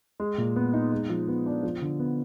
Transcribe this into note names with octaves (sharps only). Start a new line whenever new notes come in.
G#3
A#2
B3
D#4
G#3
F3
B3
D4
F3
D3
B3